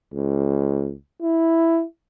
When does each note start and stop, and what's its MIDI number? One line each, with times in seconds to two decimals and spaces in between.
0.13 0.93 37
1.22 1.83 64